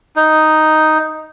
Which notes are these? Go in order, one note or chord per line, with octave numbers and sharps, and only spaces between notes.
D#4